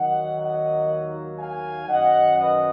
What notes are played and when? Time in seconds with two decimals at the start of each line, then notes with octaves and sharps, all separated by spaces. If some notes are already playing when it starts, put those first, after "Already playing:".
Already playing: D#2 D#3 F#3 A#3 D#5 F#5
0.39 D#5 F#5
1.39 F5 G#5
1.88 F#2 D#3 F#3 C#4 D#5 F#5
2.38 B4 D#5